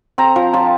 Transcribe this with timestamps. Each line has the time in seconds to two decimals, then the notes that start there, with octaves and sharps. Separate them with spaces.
0.18 C4 A#5
0.36 F3
0.53 F3 A5